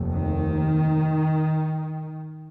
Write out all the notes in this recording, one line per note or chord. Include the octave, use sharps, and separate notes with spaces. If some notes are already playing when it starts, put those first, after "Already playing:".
Already playing: F1 D#2
D#3